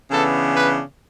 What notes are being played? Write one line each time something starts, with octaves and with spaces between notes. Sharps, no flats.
C#3 E3 B3 D4 A4
B4